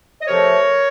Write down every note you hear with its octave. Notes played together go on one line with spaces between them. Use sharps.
D#5
C3 F3 A3 A#4 C#5